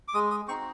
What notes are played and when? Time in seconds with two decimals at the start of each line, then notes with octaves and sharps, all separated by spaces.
0.08 D6
0.14 G#3 D#6
0.31 D#6
0.48 C4 D#4 F#4 C#6